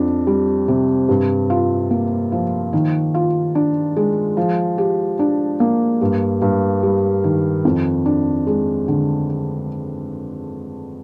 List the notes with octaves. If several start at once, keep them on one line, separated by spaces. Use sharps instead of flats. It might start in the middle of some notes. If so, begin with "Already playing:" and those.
Already playing: F2 D4
G3
C3
G2
F4
A#3
F3
D#3
F4
D4
G#3
F3
G4
D4
A#3
G2
G2
G3
D#3
F2
D4
G#3
D3